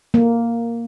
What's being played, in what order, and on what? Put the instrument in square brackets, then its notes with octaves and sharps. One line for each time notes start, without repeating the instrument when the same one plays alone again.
[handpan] A#3